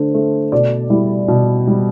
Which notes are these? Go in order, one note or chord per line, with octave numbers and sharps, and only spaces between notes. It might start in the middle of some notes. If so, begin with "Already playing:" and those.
Already playing: D3 A3 C5
A3
B2 D5
G3 E4
B2
G3